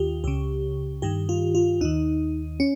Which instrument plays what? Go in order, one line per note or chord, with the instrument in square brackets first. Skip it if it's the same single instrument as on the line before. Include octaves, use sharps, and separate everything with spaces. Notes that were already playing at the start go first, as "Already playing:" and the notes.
Already playing: [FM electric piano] D#2 D#3 F4 G4
C#2 C#3 G4
G2 D#3 G4
F4
F4
D#2 D#3 D#4
C#4